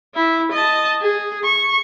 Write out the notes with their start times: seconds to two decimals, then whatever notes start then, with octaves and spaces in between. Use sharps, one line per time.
0.15 E4
0.52 D#5 A5
1.02 G#4
1.44 C#6